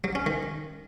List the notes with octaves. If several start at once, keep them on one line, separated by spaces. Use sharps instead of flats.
F#3
C#4
D#3